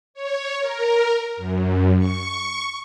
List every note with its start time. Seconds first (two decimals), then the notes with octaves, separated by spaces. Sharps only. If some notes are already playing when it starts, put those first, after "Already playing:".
0.14 C#5
0.59 A#4
1.37 F#2
1.98 C#6